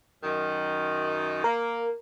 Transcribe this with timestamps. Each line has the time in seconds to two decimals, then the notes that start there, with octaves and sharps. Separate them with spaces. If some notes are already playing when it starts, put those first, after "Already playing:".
0.23 F#2 D#3
1.44 A#3 A#4